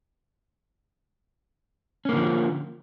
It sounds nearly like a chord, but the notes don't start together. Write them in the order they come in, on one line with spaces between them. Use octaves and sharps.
C#4 A#3 D3 F3